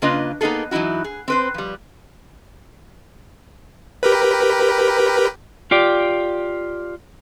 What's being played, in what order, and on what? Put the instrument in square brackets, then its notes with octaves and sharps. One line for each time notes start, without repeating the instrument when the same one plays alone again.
[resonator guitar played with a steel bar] C#3 A#3 D4 F4 B4 D#5
A#3 B3 D#4 F#4 G#4 A4
E3 F#3 D#4 E4 F#4
G#4
C4 B4 C5
F3 G3
[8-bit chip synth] G4 A#4 B4
[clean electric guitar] F4 G4 D5